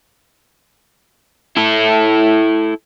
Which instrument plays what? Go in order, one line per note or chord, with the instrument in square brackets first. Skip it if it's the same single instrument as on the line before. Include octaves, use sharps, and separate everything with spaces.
[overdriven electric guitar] E4 A4